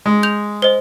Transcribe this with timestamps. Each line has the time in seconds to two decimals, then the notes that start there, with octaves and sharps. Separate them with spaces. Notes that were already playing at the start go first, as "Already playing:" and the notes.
0.06 G#3
0.23 G6 F7
0.62 C5 D#5